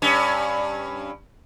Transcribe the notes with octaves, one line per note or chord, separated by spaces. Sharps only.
G2 C#4